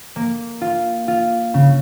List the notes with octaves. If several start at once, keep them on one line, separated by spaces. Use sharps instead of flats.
A#3
F4
F4
C#3